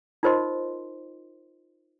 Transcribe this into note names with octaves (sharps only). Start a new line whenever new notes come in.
D#4 F4 A#4 C5 D#5 C6